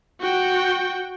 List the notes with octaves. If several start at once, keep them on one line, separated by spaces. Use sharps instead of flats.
F#4 G5